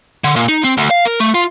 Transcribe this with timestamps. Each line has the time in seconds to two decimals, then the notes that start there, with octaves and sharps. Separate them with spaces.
0.24 D3
0.36 A#2
0.49 D#4
0.64 C4
0.78 D2
0.91 F5
1.05 A#4
1.20 A3
1.34 F4